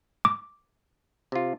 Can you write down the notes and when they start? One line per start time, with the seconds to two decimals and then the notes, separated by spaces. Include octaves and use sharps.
0.25 D6
1.32 C3 F4